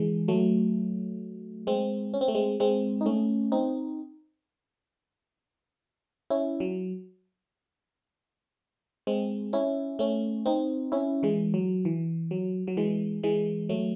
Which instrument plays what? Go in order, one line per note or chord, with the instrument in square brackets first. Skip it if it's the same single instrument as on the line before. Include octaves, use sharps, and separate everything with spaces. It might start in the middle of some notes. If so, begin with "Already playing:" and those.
Already playing: [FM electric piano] E3 G#3
F#3 A3
G#3 C4
C#4
C4
A3
G#3 C4
G#3 C4
D#4
A3 C#4
C4 D#4
C#4 E4
F#3
G#3 C4
C#4 E4
A3 C#4
C4 D#4
C#4 E4
E3 G#3
F#3
E3
F#3
F#3
E3 G#3
E3 G#3
F#3 A3